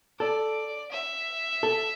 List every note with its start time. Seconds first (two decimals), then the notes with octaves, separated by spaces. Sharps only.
0.20 A4 D5
0.92 E5
1.63 A4